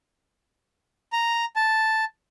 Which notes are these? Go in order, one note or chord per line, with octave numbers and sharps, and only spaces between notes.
A#5
A5